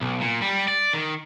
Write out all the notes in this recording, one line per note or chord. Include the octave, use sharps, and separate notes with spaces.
B1
A#2
G3
D5
D#3